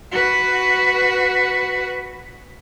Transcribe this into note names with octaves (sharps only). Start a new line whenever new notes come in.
F#4 B4